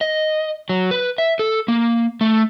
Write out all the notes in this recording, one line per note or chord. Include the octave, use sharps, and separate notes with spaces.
D#5
F#3
B4
E5
A4
A#3
A3